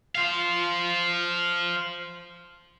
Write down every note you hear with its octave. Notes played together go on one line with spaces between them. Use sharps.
C5 F5